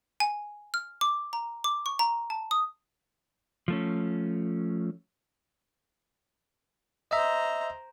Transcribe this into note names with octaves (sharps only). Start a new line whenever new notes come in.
G#5
F6
D6
A#5
D6
C#6
A#5
A5
D#6
F3 A3 C#4
C5 D#5 E5 A#5